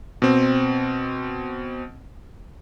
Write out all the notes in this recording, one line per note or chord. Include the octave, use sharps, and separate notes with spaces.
B2 C4